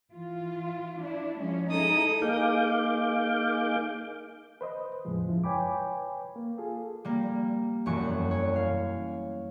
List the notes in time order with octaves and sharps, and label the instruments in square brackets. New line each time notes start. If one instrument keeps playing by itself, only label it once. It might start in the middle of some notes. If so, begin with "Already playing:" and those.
[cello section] E3 F4
D4 E4
F3 G#3 C#4
[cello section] D#4 E4 G#4 [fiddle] A4 D#6
[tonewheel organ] A#3 D#4 G#4 F5 D6 G6
[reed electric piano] B4 C5 D#5
E2 A2 C#3 F3 G#3
F#2 F3 E4
B4 C#5 G5 G#5 B5 D6
A#3
F4 G#4 A4
[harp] G3 A#3
E1 F#2 C#6
C#5
F5